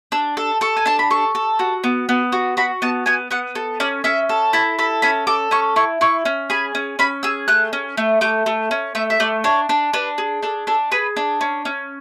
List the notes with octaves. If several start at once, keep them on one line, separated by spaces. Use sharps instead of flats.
D4 E6
A4
A4 C#6
G#5
D4 A5
B5
A4 C#6
A4
F#4
B3
B3
F#4
F#4 B5
B3 A5
B3 G#5
B3 F#5
A4
C#4 D5
C#4 E5
A4
E4 A5
A4 B5
C#4 B5
A4 D6
C#4 C#6
E4 C#6
E4 C#6
C#4
G#4 B5
C#4
C#4 B5
G#4 E6
A3 F#6
C#4
A3
A3 D6
A3
C#4
A3 E5
E5
A3 D5
D4 C#5
D4
D4 B4
G#4
D4 A4
D4 A4
G#4 B4
D4
C#4
C#4